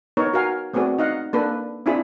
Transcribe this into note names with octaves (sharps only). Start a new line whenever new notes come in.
B3 D#4 A#4 C#5
F#4 A#4 F5 G#5
A3 B3 C4 F#4 G#4 D5
D#4 D#5 F5 F#5
A#3 D4 A4 B4
C4 D4 E4 F4 G#4 B5